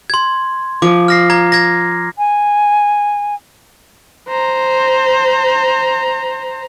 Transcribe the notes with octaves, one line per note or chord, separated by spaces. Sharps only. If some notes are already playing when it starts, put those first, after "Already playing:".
C6 G#6
F3 D6
F6 A#6 C7
A#5 G#6
G#6 A#6
G#5
C5 A#5